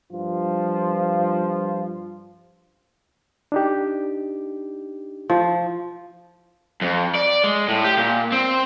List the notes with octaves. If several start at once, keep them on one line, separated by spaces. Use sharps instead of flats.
G2 F3 F4
D4 D#4 G4
F3
F2
D5
G#3
A2
G4
A#2
C4